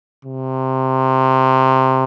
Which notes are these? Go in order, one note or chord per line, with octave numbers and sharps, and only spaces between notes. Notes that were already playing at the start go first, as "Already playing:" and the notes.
C3